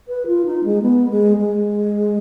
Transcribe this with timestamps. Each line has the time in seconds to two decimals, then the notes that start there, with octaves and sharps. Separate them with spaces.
0.08 B4
0.26 F4
0.45 D#4
0.64 G#3
0.82 B3
1.10 G#3
1.38 G#3